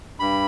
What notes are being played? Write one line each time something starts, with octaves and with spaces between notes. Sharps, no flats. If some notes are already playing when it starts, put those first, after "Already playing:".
G2 B5